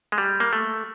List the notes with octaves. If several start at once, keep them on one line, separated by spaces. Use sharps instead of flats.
G#3
G3
A#3
A3